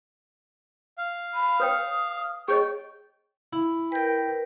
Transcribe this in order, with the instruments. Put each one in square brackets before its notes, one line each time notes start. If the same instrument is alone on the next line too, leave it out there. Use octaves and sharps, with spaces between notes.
[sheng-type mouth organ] F5
[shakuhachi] B5
[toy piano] B4 C#5 G5 [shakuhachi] D#6
[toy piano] G#4 C#5 D#5 [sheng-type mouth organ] G5 [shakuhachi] C#6
[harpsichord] E4
[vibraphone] A#4 B4 [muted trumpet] G5